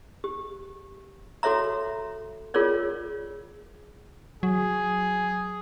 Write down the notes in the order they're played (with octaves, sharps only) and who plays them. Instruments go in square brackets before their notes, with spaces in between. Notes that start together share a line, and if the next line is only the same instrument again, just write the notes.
[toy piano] G4
F#4 A4 C#5 E5 A#5
F4 G#4 A#4 C#5 D5
[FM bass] F#3 [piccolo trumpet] G#4